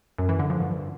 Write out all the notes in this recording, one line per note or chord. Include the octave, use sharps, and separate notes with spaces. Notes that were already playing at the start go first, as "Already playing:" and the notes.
F#2
E3
D3
F3
G2